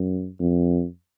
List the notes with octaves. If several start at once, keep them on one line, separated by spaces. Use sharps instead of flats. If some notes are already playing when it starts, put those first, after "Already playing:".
Already playing: F#2
F2